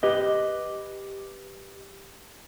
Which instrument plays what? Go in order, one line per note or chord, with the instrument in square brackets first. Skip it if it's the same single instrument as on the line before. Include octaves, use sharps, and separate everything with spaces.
[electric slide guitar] G4 B4 D#5